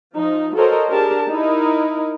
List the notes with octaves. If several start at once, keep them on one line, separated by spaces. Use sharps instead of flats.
F3 D#4
F#4 A4 A#4 C5 C#5 D#5
D4 G4 G#4 A#4 A5
D#4 E4 A#4